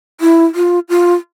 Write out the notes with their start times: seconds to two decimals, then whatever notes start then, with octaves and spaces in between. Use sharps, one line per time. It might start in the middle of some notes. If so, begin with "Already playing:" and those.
0.21 E4
0.55 F4
0.89 F4